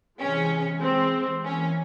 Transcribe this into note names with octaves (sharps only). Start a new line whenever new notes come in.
C3 E3 G#3 C#4
E3 G#3 C4
E3 A#3 C#4